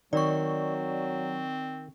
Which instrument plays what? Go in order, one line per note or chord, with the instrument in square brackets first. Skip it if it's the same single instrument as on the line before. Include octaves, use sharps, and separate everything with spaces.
[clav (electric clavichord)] D#3 [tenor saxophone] F#3 [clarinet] C4 [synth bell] D5 C#6